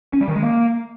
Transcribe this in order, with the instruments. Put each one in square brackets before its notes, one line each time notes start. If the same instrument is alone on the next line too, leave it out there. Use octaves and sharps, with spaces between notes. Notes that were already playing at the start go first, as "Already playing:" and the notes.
[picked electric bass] C#4
G3
D#3
G#3
A#3